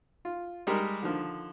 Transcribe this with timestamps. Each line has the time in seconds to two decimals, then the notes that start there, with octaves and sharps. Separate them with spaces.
0.25 F4
0.67 G3 G#3 G4 A#4
1.02 D3 D#3 F3